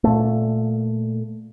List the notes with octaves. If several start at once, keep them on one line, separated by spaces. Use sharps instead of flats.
A#2 A3